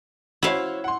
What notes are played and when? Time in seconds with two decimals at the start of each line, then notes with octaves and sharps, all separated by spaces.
0.43 E4 F#4 C5 C#5 F5
0.84 F#5 C6